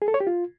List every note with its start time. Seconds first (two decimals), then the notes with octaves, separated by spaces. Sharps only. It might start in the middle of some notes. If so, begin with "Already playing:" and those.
0.02 G#4
0.08 A4
0.14 C#5
0.20 G4
0.27 F4